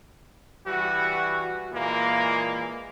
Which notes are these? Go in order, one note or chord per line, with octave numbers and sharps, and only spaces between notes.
E3 G3 F#4
A#2 E3 G#3 A#3